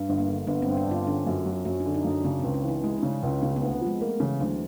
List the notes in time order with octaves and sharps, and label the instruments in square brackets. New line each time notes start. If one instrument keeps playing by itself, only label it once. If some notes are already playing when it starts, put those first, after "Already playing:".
Already playing: [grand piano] G2
G1
[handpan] A#3
[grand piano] D3
[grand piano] G1 [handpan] B3
[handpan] C4
[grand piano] G2
[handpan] D4
[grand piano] G1 [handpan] F4
[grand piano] D3 [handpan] C#4
[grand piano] F#2
F#3
[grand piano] F#2 [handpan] C#4
[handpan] D4
[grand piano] D3
[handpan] D#4
[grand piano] F#2
[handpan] D4
[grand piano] C#3 [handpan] C#4
[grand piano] C#2 [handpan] C4
[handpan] C#4
[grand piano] E3
[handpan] D#4
[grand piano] G#3 [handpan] E4
[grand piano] C#3 [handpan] D4
[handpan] C#4
[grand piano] C#2
[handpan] C#4
[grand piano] C#3 [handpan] B3
[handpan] B3
[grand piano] D2
[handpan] C4
[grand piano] F3
[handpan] G#3
[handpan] A3 [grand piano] A#3
[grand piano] C#3 [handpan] E3
[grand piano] D2 [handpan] F#3